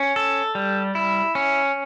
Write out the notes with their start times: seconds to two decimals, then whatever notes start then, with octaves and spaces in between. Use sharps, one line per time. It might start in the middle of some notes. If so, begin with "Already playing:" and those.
Already playing: C#4
0.16 A4
0.55 G3
0.95 E4
1.35 C#4